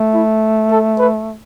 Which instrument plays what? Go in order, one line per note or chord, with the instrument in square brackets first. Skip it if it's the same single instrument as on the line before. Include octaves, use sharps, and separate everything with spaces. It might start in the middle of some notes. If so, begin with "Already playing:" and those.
Already playing: [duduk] A3
[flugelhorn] E4
A4
B4